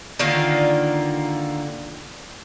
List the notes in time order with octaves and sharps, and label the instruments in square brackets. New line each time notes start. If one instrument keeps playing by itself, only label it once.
[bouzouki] D3 D#3 A#3 F4